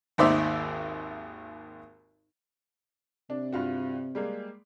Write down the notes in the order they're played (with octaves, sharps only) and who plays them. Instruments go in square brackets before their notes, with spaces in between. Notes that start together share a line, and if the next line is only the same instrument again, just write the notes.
[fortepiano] G#1 D#2 D#4 C5 D5 E5
[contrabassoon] C3 [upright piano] D4
[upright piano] G2 F4 F#4
G3 G#3 A#3